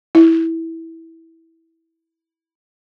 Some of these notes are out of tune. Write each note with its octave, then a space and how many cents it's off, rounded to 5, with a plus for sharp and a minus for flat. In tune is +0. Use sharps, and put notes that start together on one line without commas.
E4 -10